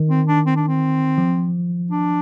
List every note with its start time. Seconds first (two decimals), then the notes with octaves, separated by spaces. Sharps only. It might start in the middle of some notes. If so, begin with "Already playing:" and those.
Already playing: D#3
0.09 C4
0.27 D4
0.46 C4
0.56 D4
0.68 C4
1.18 F3
1.91 D4